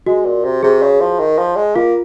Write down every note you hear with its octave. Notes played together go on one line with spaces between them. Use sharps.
G#3 F#4
A#2
C3
C3 G#4
C#3
F3
D#3
F3
G#3
A#3 F4